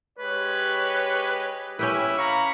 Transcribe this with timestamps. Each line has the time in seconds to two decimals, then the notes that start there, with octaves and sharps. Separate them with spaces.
0.19 G#3 G4 B4 C#5
1.79 C#4 E4 G4 B4
2.18 F5 A#5 B5 C#6